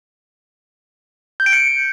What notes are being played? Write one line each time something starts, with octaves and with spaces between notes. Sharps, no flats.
G6
D7
C#7